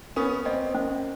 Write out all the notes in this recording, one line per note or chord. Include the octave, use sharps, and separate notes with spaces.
B3 C#4 A#4
A#3 C4 D#5
C#4